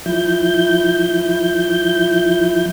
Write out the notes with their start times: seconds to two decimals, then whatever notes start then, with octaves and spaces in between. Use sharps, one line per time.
0.06 F3 E4 G6